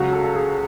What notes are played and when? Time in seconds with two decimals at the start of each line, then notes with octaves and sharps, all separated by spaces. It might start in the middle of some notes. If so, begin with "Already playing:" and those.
Already playing: C#2 C#3 F#3 F#4
0.13 A4
0.24 A4
0.35 G#4